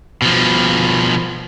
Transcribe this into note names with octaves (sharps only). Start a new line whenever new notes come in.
B2 F3